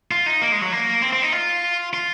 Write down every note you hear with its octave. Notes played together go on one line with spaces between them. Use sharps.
F4
D#4
A#3
G#3
F#3
A#3
C4
C4
D#4
F4
F4